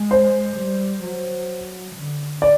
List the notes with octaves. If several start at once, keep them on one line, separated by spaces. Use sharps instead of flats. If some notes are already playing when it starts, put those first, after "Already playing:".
Already playing: G#3
C5
G3
F#3
D3
D5